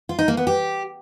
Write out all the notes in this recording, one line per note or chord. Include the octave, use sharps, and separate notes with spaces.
F4
D#4
A#3
B3
G4